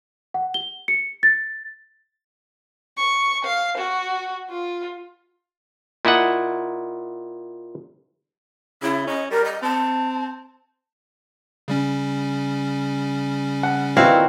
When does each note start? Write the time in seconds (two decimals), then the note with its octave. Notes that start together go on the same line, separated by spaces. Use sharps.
0.34 F#5
0.54 G7
0.88 C#7
1.23 A6
2.97 C#6
3.45 F5
3.77 F#4
4.49 F4
6.05 A#2 E4 D#5 F#5
8.82 C#3 E4
9.07 C#4 D#5
9.31 G3 A#4
9.45 D#5
9.63 C4 A5
11.68 C#3 G3 C#4
13.63 F#5
13.97 A#2 D#3 E3 C4 E4 F#4 F5